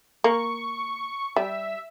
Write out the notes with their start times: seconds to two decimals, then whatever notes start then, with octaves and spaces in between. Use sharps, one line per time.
0.24 A#3 C#6
1.36 G3 E5